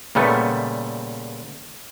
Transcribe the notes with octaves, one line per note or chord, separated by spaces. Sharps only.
A#2 C#3 G3 A3 B3